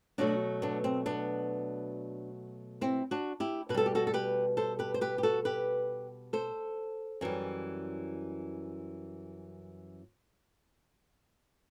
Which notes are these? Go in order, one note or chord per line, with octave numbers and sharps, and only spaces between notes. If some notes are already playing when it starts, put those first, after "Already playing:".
B2 F#3 A3 D4 F#4
B3 D4
C4
B3 D4
C4 E4
D4 F#4
E4 G4
B2 B4
G3 A4
G4
F#4 A4
A4
G4 B4
A4 C5
G4 B4
C5
G4 B4
G4
F#4 A4
G4 B4
A4 C5
F#2 E3 G3